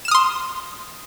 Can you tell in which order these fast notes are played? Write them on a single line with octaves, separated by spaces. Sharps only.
E7 F6 D#6 C6